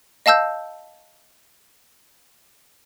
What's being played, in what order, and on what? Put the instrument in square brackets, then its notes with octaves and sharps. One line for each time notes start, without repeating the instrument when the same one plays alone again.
[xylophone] D#5 F5 A5 E6 G6